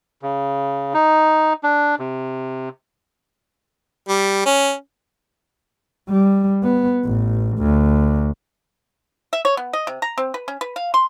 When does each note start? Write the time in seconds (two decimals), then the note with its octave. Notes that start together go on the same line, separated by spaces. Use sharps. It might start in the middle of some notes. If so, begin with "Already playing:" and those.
0.22 C#3
0.94 D#4
1.63 D4
1.99 C3
4.08 G3
4.46 C#4
6.09 G3
6.63 B3
7.05 A1
7.58 D2
9.33 E5
9.45 C#5
9.57 B3
9.73 D#5
9.87 C3
10.02 A#5
10.18 C4
10.34 B4
10.48 C#4
10.61 B4
10.76 F5
10.94 C6